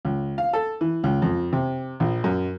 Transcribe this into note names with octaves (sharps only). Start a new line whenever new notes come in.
C#2
F5
A4
E3
C#2
F2
C3
A#1
F#2